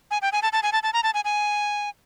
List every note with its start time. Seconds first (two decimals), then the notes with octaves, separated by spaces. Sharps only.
0.11 G#5
0.22 G5
0.32 G#5
0.42 A5
0.53 A5
0.63 G#5
0.73 A5
0.83 A5
0.93 A#5
1.03 A5
1.14 G#5
1.25 G#5